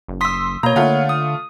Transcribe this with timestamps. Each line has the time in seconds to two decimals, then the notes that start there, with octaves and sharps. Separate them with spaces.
0.08 F#1
0.21 C6 D#6 E6 B6
0.63 B2 A#3 C#5 A#5
0.76 D3 A3 F4 F#5
1.09 D#6